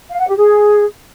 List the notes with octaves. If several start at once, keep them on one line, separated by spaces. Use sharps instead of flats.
F5
F#5
G4
G#4